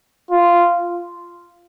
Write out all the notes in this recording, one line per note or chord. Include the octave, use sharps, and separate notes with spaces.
F4